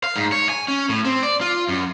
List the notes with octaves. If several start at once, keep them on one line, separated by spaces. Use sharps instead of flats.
F5
G#2
C#5
G#5
C#4
A2
C4
D5
F4
F#2